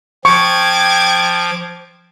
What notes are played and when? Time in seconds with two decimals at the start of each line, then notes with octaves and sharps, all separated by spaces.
0.25 F3 G5 C#6 D6 G#6